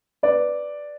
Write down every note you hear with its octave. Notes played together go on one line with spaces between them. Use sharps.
B4 D5